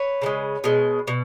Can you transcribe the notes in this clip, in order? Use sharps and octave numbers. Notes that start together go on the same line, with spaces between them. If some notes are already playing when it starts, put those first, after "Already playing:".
Already playing: B4 C#5
C#3 E3 G#3
B2 G#3
B2